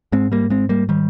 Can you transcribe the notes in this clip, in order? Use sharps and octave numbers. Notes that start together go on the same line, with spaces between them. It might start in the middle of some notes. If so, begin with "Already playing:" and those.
G#2 G#3 C4
G3 A#3
G#3 C4
G3 A#3
D#3 G3